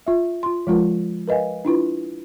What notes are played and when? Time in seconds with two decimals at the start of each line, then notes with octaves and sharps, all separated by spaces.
0.07 F4 E5
0.43 F4 C6
0.67 F3 G#3 F4 A#4
1.28 A#4 B4 D#5 F5 G#5
1.65 D4 E4 F4 B4